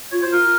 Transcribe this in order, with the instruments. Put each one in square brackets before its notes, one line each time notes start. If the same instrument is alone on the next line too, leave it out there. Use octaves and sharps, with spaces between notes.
[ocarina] F4 [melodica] C#5
[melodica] C5
[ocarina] F4 [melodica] A#4